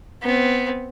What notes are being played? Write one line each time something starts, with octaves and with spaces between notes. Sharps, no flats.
B3 C4